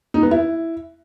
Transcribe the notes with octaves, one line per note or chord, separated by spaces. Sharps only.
D#4
B3
E4